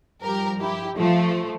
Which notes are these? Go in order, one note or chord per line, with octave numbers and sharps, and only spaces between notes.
G2 F3 G4 A#4
E4 G4
F3 A3